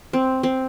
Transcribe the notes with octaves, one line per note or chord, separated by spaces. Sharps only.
C4
C4